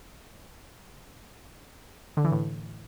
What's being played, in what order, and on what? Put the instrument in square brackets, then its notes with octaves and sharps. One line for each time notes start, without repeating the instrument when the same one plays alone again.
[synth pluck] D3
E3
A2